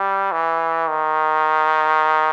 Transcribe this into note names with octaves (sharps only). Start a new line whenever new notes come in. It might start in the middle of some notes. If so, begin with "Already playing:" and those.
Already playing: G3
E3
D#3